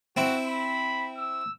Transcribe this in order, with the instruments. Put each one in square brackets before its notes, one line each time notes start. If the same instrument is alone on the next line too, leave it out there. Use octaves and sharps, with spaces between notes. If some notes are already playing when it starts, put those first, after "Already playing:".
[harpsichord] C4 E4 [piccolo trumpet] F#4
[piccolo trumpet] B5
E6